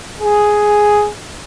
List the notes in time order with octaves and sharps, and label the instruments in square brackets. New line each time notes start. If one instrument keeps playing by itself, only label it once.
[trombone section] G#4